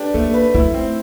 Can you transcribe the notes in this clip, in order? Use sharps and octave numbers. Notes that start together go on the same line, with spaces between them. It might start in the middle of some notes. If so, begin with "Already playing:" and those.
Already playing: A3 D4 G4 B4
A3 A#3
B4
A3 E4
C4